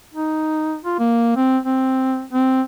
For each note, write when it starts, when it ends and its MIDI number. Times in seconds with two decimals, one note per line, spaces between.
0.14 0.78 63
0.84 0.97 65
0.99 1.35 58
1.37 1.58 60
1.65 2.25 60
2.33 2.62 60